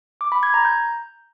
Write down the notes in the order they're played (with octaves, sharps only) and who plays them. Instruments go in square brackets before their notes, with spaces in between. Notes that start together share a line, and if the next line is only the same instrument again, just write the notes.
[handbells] D6
B5
G#6
A#5
G6